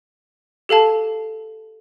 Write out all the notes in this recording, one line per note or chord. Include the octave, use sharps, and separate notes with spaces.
G4 A4 F5 A5